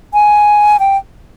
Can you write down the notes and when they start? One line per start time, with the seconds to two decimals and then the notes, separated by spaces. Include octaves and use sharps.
0.14 G#5
0.79 G5